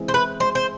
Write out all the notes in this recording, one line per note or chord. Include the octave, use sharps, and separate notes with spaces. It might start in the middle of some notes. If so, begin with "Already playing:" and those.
Already playing: E3 G#3 C4
C5
E4 B4
G#3 C5
C5